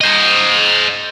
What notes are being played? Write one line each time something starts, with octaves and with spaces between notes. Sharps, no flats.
C5 D#5